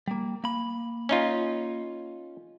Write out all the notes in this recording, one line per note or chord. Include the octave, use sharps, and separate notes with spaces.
G3 A#3
A#3 B5
C#4 D#4 F4